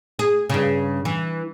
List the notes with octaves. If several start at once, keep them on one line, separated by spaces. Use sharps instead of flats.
G#4
G2 C#3
E3